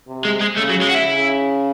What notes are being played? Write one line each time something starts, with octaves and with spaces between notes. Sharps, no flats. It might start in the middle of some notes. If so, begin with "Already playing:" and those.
C3
G#3
G#3
C#3 A3
F#3
G#3
F#4
E4
C#3